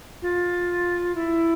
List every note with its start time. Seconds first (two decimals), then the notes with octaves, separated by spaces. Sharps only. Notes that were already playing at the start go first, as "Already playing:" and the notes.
0.22 F4
1.15 E4